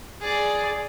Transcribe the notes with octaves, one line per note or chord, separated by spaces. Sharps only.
G#4 D5